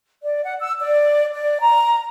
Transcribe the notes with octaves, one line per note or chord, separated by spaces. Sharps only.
D5
F#5
E6
D5
D5
A#5